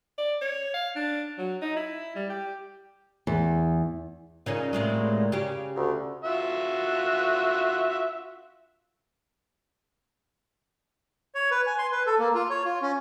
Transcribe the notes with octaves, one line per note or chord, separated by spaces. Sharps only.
D5
C#5
F5
D4
F#3
D#4
E4
G3
G4
E2
A#2 C#3 C#4 D#4
A2 C3 G#3
C#3 G4
D2
F4 F#4 E5
C#5
B4
G#5
C6
B4
A4
A#3
F4
C#5
F4
C#4